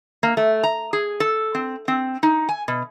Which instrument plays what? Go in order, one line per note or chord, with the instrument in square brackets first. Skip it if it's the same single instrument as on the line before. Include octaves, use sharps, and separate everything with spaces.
[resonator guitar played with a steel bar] A#3
A3
A#5
G#4
A4
C4
C4
D#4
G#5
B2